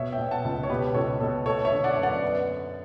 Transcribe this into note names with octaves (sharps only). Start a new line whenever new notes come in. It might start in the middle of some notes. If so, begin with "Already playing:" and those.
Already playing: B2 C#5 E5
E5 G5
B2
F#5 A5
C#2
C#5
B2 G4 B4
C#2 A4 C#5
B2 A4
A3 A4 C#5
C#5 E5
D3
D5 F#5
F#2
D5 F#5
B3